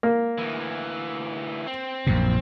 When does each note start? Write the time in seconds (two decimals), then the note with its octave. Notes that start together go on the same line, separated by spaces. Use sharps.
0.03 A#3
0.38 D2 E3
1.67 C4
2.07 A#1 F#2 A#2